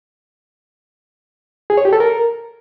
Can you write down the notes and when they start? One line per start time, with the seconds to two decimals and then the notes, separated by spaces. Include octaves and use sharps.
1.70 G#4
1.77 C#5
1.85 G4
1.93 A4
2.00 A#4